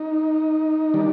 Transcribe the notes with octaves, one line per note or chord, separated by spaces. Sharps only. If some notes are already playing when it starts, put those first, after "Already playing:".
Already playing: D#4
D#3 G3 D4